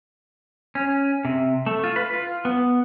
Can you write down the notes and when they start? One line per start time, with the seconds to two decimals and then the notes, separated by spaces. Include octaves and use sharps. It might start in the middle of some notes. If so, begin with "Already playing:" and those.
0.75 C#4
1.25 C3
1.66 A3
1.84 F4
1.96 B4
2.14 F4
2.45 B3